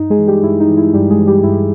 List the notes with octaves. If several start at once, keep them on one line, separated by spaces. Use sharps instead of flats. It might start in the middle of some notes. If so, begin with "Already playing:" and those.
Already playing: G2 D#4
G#3 G#4
E3
G3 G4
G2 E4
D#4
E3
E4
G2 G3 G4
G#3 G#4
E3
G3 G4
G2 E4